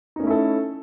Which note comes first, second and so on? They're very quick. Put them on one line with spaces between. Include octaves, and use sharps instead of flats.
D#4 C#4 A3 E4 A4